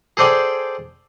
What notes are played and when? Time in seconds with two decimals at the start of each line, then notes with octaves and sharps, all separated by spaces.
0.17 G#4 A4 C5 D5 G5 G#5